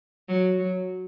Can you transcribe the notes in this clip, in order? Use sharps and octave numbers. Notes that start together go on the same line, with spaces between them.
F#3
F#3